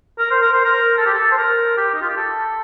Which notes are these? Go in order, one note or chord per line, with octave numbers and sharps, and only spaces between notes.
A#4
C5
A#4
C5
A#4
A4
G4
A4
C5
A#4
G4
D#4
F4
G4
A4